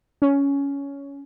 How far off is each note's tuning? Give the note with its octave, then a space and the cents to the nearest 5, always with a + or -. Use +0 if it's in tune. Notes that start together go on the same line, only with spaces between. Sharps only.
C#4 +15